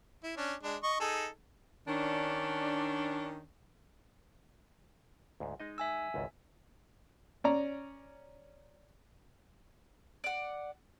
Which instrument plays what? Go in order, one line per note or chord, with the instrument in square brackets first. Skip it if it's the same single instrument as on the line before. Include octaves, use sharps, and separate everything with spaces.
[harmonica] E4
C#4 D4
G#3 D4
D#5 C#6
D#4 G#4 A4
[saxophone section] D#3 C#4 D4
[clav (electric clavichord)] D2 G#2
G#3 D#4 D#5
[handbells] E5 G#5 E6
[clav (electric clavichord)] G#1 C#2 G#2
[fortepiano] C#4 D5 A#5
[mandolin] D5 F#5